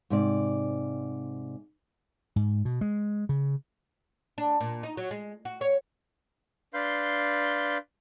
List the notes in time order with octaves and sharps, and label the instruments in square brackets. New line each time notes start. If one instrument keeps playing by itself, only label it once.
[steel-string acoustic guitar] G#2 C3 D5
[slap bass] G#2
B2
G#3
C#3
[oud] D4
A#2
D#4
F#3
G#3
F#4
C#5
[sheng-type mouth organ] D4 B4 F5 C6 G6